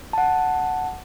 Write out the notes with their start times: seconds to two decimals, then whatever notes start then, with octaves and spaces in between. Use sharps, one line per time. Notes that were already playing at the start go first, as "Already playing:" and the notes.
0.13 F#5 A5